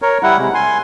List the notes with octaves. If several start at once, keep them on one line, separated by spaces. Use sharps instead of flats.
A#4 C#5
G3 E4 F#5
C3 G#3
G#5 C6